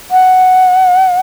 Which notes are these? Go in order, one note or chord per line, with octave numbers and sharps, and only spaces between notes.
F#5